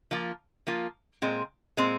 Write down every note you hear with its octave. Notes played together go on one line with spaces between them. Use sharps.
F3 A#3 F4
F3 A#3 F4
A#2 G#3 C4
A#2 G#3 C4